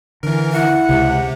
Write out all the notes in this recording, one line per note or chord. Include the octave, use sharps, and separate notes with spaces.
D3 E3 A#4
E4 F#5
C#2 C3